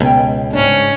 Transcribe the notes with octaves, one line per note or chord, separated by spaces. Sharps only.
C#2 B2 G5
G#2 C#4 D4